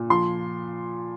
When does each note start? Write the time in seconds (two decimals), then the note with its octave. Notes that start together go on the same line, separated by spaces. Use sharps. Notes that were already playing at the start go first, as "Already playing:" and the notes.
Already playing: A#2
0.10 F3 C6